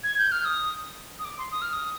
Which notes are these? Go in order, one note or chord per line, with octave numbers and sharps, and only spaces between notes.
G#6
G6
F6
D#6
D#6
D6
C6
D#6
F6
D#6